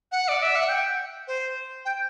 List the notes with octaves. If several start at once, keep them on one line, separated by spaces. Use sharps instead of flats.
F#5
D5
E5
F#5
G5
C5
G5